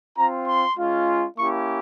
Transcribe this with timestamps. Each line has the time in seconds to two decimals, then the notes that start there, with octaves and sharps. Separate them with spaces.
0.16 C4 F4 A#5
0.46 C6
0.77 G#3 C#4 F4
1.37 A#3 C#4 E4 G4 C#6